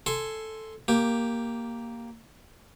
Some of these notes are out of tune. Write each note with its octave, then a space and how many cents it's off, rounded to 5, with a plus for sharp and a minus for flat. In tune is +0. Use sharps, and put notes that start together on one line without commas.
A4 +0 G#5 +0 C6 +0
A#3 +0 G4 +0